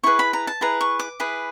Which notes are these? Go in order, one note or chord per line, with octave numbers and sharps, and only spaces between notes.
E4 G#4 B4 C#6
B5
A#5
A5
E4 G#4 B4 A#5
C#6
D6
E4 G#4 B4